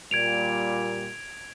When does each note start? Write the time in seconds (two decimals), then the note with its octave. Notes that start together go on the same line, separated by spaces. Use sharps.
0.11 A#2 G3 G#6 D7 F7